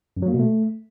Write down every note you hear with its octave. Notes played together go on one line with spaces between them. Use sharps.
F#2
F#3
A#3
B2
A3